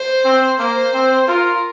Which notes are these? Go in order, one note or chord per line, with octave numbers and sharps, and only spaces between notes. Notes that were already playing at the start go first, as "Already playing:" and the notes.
Already playing: C5
C4
A#3 C5
C4
F4 A#4